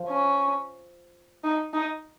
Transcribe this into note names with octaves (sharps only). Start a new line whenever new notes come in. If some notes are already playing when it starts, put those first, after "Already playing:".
Already playing: F3
C#4
D#4
D#4